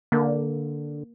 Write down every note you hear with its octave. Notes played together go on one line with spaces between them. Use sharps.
D3 A#3